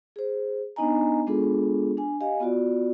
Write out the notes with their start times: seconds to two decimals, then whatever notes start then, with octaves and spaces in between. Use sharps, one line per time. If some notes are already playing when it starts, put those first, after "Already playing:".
0.16 G#4 C5
0.76 B3 D4 D#4 D#5 G#5 A#5
1.27 G#3 B3 D4 F4 G#4 A4
1.97 D4 G#5
2.21 G4 D#5 F5 G#5
2.40 B3 F4 F#4 D5